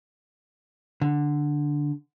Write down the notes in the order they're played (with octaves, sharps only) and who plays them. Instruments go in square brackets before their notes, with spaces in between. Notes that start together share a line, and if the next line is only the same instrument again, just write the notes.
[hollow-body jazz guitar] D3